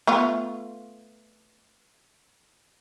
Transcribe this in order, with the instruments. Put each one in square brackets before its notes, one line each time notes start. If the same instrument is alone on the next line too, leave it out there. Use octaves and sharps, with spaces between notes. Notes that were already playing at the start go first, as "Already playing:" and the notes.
[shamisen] A3 B3 F4